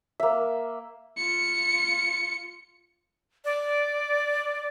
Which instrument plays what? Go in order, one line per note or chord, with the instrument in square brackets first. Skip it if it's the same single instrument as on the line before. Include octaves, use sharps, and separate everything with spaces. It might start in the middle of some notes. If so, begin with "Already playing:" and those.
[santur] A#3 E5
[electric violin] F4 C#7
[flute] D5